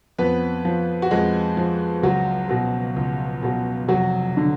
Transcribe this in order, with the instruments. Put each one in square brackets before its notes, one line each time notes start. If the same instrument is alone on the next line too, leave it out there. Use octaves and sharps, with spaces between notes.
[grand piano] F2 B3 B4
F3
F#4
F2 G#3 G#4
F3
C#2 F#3 F#4
B2 F#3
C#2
B2 F#3
F1 F#3 F#4
D3